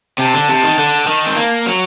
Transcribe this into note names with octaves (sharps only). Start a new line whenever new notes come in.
C3 A5
D3
C3
D#3
D3
D#3
C4
A#3
F#3